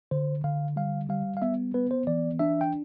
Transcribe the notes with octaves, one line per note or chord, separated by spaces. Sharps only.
D3 C5
D3 F5
G3 F5
G3 F5
F5
B3 E5
B3 B4
C5
E3 D5
D4 E5
G5